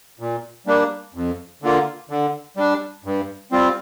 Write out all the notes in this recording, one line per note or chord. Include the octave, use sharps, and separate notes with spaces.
A#2
G3 A#3 D4
F2
D3 A#3 F4
D3
G3 D4
G2
G3 C4 F4